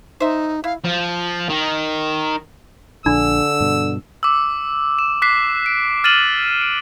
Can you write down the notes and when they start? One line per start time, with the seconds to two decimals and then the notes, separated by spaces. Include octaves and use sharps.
0.20 D#4 C5 E5
0.64 E4 F5
0.85 F3
1.49 D#3
3.06 A#1 D3 D4 E6
3.60 G2 B2
4.23 D6 E6
4.99 E7
5.22 D6 F#6 B6 C7
5.66 D7
6.04 F6 A6 D#7 E7 F#7
6.61 D7